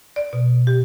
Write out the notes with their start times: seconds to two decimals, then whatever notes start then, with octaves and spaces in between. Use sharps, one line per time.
0.16 D5
0.33 B2
0.67 G4